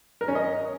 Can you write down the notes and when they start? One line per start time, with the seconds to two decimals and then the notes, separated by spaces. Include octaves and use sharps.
0.21 A#4
0.28 C#4
0.35 D#5